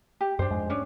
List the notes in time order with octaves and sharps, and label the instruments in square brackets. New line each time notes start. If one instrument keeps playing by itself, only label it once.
[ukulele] G4
[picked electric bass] F#2 [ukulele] D4 C5
[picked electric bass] F2 G#2 G#3
[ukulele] C#4 D4